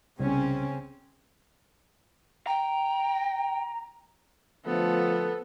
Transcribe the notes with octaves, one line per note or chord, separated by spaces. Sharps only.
C2 C#3 C4 C#4
G5 A#5
D3 F3 A3 B3 A4